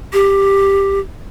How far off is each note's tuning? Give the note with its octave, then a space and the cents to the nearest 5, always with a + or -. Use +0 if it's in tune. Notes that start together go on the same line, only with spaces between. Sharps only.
G4 +5